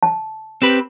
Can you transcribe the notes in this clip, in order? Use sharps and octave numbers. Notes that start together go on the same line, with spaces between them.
A5
C4 G4 B4